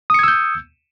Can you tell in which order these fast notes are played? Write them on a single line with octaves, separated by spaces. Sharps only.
D#6 C#7 G#6 E6 G6